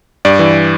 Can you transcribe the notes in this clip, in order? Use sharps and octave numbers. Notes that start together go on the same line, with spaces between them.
G2 D5
E3